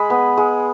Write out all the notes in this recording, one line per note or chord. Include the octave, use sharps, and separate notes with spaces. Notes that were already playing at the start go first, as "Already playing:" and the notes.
Already playing: G#3 G#4 B5
B3
G#3